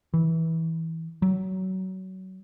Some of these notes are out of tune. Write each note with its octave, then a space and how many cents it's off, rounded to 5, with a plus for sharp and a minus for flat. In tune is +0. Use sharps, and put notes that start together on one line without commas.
E3 -20
F#3 +25